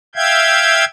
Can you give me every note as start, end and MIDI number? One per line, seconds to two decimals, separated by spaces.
0.15 0.85 76
0.15 0.85 77
0.15 0.85 79
0.15 0.85 91
0.15 0.85 92